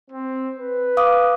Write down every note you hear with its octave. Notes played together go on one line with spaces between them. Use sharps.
C4
B4
F5 D6 D#6